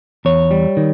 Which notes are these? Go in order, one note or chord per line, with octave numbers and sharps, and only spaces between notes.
E2 C#5
G3
D#3